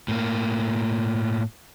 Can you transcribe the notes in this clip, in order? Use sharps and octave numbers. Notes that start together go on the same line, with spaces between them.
A2 A#3